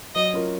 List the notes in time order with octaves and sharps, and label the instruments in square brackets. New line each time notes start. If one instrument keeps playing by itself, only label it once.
[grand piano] F#3 [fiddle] D#5
[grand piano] C#4 F4 A#4